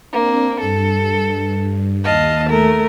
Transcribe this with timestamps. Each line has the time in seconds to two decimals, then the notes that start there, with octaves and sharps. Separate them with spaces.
0.13 A#3 C4 D4
0.61 G2 A4
2.04 D#2 D#5 F5 A5
2.48 A3 A#4